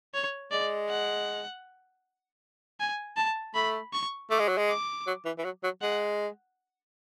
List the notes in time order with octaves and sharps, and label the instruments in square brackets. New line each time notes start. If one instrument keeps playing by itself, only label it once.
[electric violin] C#5
[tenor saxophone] G#3 [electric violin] D5
[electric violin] F#5
G#5
A5
[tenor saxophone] A3 [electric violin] B5
[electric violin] C#6
[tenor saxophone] A3 [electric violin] D6
[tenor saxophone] G#3
F#3
G#3
[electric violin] D6
[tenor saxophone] F#3
E3
E3
F#3
F#3
[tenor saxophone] G#3 [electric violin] F#5